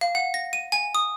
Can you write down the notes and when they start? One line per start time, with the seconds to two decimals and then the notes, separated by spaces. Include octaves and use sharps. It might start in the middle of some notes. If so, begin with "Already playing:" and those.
0.01 F5
0.15 F#5
0.34 A#6
0.53 D#7
0.72 G#5
0.95 D#6